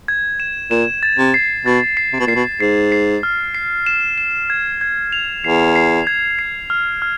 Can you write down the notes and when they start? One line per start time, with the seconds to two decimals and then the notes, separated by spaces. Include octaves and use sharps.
0.08 G#6
0.40 E7
0.71 A#2 E7
1.03 A6
1.18 C3
1.34 C7
1.65 B2 A6
1.97 C7
2.13 C3
2.20 B2
2.27 A#2 C7
2.35 B2
2.60 G#2 C7
2.92 C7
3.23 F6
3.55 C7
3.86 E7
4.18 E7
4.50 G#6
4.81 G#6
5.12 F7
5.44 E2 C7
5.76 C7
6.07 G#6
6.39 C7
6.70 F6
7.02 F6